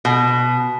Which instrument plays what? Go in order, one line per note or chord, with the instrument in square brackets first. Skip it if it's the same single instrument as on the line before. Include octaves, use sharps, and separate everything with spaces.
[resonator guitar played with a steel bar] B2